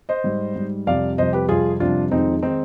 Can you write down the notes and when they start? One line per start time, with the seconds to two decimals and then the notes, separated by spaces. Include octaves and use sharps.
0.09 C5 D#5
0.24 G#2 G3
0.56 G#2 G3
0.87 F2 C3 G3 D5 F5
1.18 F2 C3 G3 C5 D#5
1.33 G4 B4
1.49 F2 C3 G3 F4 G#4
1.80 F2 C3 G3 D4 F4
2.11 F2 D#3 G#3 C4 D#4
2.42 D#3 G#3 C4 D#4